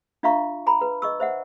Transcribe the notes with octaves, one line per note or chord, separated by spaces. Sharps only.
D4 F4 E5 F5 A#5 C#6
G#5 A#5 B5
B4
D#5 C#6 E6
C5 E5 F#5